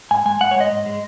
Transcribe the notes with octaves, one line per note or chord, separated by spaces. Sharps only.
G#2 G#5
G#3 G#5
G#2 F#5
C#5
G#3 D#5
G#2
G#3